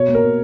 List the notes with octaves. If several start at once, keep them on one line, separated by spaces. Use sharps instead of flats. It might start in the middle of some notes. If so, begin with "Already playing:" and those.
Already playing: B2 C#5
A#3
A#4
B2